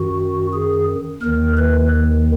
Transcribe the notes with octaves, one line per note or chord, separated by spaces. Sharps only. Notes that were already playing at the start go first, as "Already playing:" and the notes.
Already playing: F#2 D#3 F#4
G#4
D#2 D#3 A#4
B4